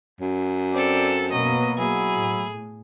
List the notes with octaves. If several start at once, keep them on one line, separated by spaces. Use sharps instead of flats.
F#2
C4 A4 D5
B2 F#3 A#3 B3 D#5
F#3 E4 G#4
A2